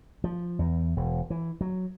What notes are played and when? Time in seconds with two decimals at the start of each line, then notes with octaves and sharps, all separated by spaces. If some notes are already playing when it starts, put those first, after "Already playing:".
0.24 F3
0.59 E2
0.97 E1
1.30 E3
1.61 F#3